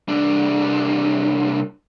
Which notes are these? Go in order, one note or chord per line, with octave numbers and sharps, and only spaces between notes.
C2 D4